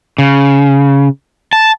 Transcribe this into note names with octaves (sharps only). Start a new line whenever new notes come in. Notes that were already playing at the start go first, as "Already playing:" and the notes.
C#3
A5